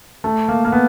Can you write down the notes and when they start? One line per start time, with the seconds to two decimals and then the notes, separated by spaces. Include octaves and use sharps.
0.24 A3
0.48 A#3
0.65 A#3
0.72 B3